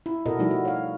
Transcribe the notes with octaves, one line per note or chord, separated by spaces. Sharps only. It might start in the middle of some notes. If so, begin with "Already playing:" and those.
E4
B2 E4 F#4 A4 A#4 D#5
F3 G3 A3 D#4 E4 F#4
F#4
C#5 F5